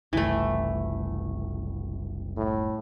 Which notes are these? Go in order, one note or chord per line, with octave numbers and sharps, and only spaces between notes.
F#1 C2 E3 A3
A2